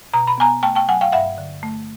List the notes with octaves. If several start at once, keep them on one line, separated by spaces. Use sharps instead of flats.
B2 A#5
B5
B3 G#5 A#5
A3 G5 A5
G5 A5
F#3 F#5 G#5
F5 G5
G2 E5 F#5
D3
A3